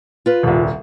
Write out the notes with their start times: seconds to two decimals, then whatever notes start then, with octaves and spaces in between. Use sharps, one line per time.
0.26 F4 B4
0.43 D#1 C2